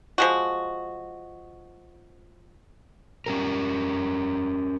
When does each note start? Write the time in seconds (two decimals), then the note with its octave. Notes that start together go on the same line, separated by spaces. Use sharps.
0.18 F3 G#3 F#4
3.26 C#4 G4 A#4